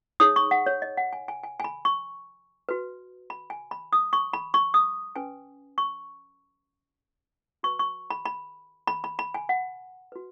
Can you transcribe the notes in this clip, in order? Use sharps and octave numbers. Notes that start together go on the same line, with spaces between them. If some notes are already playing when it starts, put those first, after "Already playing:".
D#4 G#4 C#5 D#6
C#6
F#5
C#5
D#5
F#5
G#5
G#5
G#5
G#5
B5
C#6
F#4 B4
B5
G#5
B5
D#6
C#6
B5
C#6
D#6
C#4 B4 G#5
C#6
F#4 B4 C#6
C#6
B5
B5
B5
B5
B5
G#5
F#5
F#4 B4